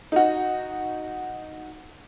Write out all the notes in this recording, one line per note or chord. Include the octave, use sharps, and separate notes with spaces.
D#4 F#4